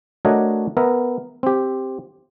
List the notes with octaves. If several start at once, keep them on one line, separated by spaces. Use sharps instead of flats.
A3 D4 F#4 A#4 C#5 D#5
B3 A#4 E5
C4 G4